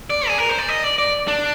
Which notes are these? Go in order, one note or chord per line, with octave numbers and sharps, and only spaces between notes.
D5
G#4
A#4
C5
D5
D#5
D5
D5
D4